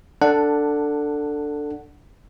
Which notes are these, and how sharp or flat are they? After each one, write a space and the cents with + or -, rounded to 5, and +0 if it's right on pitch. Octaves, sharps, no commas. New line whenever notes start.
D4 +0 A4 +15 F#5 +0